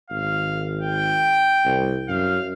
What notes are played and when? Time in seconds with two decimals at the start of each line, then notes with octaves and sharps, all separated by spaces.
0.10 G#1 F5
0.82 G5
1.65 C2
2.09 F#2 F5